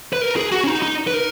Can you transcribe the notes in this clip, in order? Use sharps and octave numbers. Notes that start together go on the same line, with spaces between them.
B4
A#4
G#4
F#4
C#4
D#4
D#4
B4
A#4